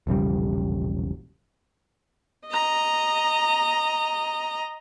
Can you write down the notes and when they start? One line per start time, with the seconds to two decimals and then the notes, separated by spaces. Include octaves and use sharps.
0.07 E1 A#1 C#3 G3
2.48 D#5 A#5